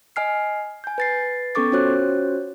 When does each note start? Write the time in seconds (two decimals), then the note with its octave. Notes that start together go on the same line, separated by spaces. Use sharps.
0.16 D#5 G#5 F6 C7
0.84 G#5 G6
0.98 B4 A6 C7
1.55 B3 C#4 A4 C#6 D6 A6
1.72 C#4 F4 F#4 C5 C#5 F#6